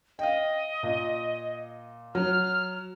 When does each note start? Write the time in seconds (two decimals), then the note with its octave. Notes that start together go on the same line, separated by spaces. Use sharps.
0.19 D#5 F5 G5
0.83 A#2
2.15 F#3 F6